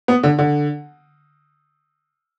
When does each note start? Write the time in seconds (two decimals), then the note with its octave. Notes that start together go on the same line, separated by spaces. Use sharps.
0.08 B3
0.23 D3
0.39 D3